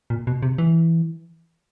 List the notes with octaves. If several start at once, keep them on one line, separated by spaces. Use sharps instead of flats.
A#2
B2
C3
E3